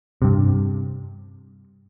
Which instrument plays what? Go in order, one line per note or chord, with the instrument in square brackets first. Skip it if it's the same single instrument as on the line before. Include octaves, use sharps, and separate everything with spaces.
[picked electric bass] G2 C3